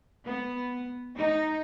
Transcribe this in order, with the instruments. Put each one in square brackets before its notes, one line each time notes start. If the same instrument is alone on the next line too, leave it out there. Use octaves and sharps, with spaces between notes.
[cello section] B3
D#4